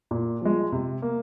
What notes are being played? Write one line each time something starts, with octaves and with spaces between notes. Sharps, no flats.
A#2
F3 G#3
C3
A#3